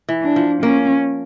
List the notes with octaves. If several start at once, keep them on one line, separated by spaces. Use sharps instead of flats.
E3
D4
F3
A#3 C#4